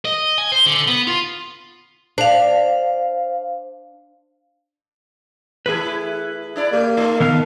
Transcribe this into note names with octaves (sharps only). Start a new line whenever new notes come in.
D#5
G#5
C5
D3
B3
F4
D4 C5 F5
E3 A3 E4 G#4 B4
D4 E4 D5
A#3 G4
A3 D#4 F4
D#3 B3 D#4 A4 A#4 F5